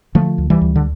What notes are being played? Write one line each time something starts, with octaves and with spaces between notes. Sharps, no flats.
D3 F3 A3
D2
E3 G3
D2
D3